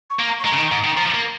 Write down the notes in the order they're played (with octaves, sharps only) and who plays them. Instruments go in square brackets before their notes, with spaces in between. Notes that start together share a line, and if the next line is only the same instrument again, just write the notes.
[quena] C#6
[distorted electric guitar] A#3
[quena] A#5
C#6
[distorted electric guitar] G#3 [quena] A#5
[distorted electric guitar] C#3
D#3
G#2
D#3
F3
A#3